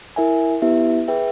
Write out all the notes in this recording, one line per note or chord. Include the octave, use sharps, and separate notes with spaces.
E4 A#4 E5 G#5
B3 E4 G4 B4 E5
G#4 B4 E5 G5